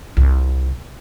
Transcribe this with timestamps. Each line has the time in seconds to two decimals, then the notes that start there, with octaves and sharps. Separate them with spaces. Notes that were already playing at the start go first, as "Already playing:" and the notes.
0.17 C2